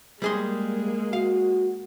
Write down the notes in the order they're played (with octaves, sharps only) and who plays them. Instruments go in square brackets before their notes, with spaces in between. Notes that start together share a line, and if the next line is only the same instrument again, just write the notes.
[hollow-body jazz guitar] G3 G#4 C6 [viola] G#3 A#3
[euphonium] F#4 [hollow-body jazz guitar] F5